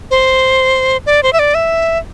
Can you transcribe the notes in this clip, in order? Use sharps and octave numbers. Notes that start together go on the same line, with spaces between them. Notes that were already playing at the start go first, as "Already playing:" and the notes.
C5
D5
C5
E5
D5
E5